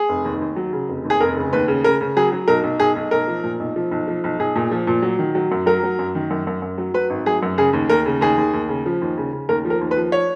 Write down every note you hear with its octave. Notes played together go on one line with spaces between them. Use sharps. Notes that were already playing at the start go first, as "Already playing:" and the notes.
Already playing: G#4
F1
D#2
D#2
F#3
C#3
F1
D#2
G#4
F1 A#4
C#3
D#2 B4
C#3
C#3 A#4
C#3
F#3 G#4
F#3
B1 A#4
B1
B1 G#4
B1
B1 A#4
F3
A#2
B1
F3
B1
F3
B1
B1 G#4
A#2
F3
A#2
F#3
D#3
F#3
F#2
F#3 A#4
F#3
F#2
D#3
F#2
F#2
F#2
F#3
F#3 B4
G#1
F#3 G#4
F#2
C#3 G#4
D#2
D#2 A#4
C#3
D#2 G#4
D#2
D#2
C#3
F3
D#2
C#3
C#3
D#2 A#4
F3
A#4
D#2
B4
F3
C#5